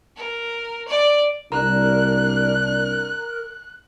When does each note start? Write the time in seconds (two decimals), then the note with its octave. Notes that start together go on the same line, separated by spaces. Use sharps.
0.16 A#4
0.88 D5
1.52 C2 D4 A#4 A#5 F#6